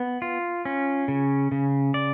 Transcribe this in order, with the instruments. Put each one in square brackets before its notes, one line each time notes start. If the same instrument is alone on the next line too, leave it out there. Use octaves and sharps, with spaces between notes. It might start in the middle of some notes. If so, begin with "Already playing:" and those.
Already playing: [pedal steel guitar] B3
F4
C#4
C#3
C#3
D5